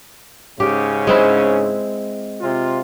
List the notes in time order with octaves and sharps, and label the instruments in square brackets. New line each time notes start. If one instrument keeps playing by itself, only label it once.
[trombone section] G#2 C#3 C#4 [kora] G4
[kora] G#3 C4 E4
[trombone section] C3 F4